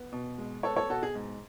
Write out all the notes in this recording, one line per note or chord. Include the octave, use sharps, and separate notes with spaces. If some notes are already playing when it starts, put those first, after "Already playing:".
Already playing: B3
B2
G#3
B3 A4 C#5
A4 C#5
B2 F#4 A4
G#4
G#2